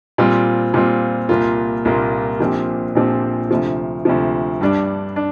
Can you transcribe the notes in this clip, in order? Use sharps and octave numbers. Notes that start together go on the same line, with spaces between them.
A#2 G3 C4 F4
A#2 G3 C4 F4
C2 A#2 A#3 F4
C2 A#2 A#3 F4
A#1 A#2 F3 C4 G4
A#1 A#2 F3 C4 G4
D2 C3 F3
D2 C3 F3
G2 G3 D4
D4